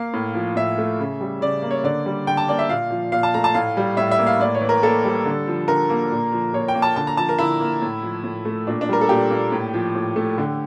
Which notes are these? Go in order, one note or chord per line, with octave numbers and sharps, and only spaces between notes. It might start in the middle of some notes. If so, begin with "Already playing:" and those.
Already playing: A#3 F5
A2
F3
A2 E5
A3
C#3
G3
C#3 D5
A#3
C#5
D3 D5
G3
D3 G5
A5
A#3 D5
E5
A#2 F5
F3
A#2 F5
A5
A3 A#5
A5
A2 F5
G3
A2 E5
E5
A#3
F5
A2 D5
C#5
E3
A#4
A#3 A4
G3
D3
F3
D3 A#4
A#3
A#2
F3
A#2 C#5
G5
A#3
A5
D3 A5
A#5
F3 A5
A#4
D3 E4
A#3
A2
F3
A2
A3
A#2 D4
D4
G3 A#4
A4
A#2 G4
A#3
A2
F3
A2
A3
D3